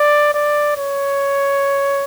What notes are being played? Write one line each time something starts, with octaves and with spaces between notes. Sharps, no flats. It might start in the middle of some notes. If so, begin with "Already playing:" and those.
Already playing: D5
D5
C#5